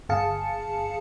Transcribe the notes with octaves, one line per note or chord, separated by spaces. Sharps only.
G1 G#4 F5 A5 C#7